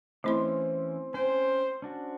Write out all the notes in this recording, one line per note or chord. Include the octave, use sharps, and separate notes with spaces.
E3 A3 C4 C#4 E4 C6
C#4 C5 G5
C#4 D4 F#4